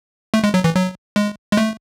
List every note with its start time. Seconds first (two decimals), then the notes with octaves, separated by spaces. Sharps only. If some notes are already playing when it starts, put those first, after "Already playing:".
0.34 A3
0.44 G#3
0.54 F#3
0.64 E3
0.75 F#3
1.16 G#3
1.52 G#3
1.57 A3